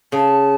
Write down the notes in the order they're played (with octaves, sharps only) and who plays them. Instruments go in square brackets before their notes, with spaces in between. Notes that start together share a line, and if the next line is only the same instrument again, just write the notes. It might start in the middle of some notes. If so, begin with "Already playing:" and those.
[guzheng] C#3 [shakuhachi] A5